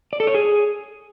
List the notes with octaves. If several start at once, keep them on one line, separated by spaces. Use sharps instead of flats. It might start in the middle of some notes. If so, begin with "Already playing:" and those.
D5
A4
C#5
G#4